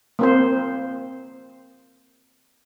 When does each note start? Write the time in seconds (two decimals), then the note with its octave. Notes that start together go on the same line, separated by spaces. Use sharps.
0.19 A#3 C4 C5